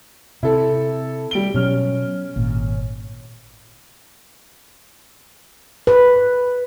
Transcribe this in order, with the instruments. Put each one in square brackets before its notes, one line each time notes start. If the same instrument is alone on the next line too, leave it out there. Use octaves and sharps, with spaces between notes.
[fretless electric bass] C3 [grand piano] E4 A4
[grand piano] G3 D7 G7
[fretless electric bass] B2 F#3 [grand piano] C#4 F6
[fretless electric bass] G#1 A#2
[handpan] B4